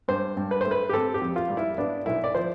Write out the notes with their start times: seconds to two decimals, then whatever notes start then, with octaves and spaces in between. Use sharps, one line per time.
0.08 G2 C5
0.37 G2
0.51 B4
0.61 A3 C5
0.71 B4
0.89 G4
0.93 C4 A4
1.14 G4
1.21 F2
1.36 F4
1.50 G3
1.57 E4
1.78 B3 D4
2.06 B1 E4
2.24 D5
2.35 F3 C5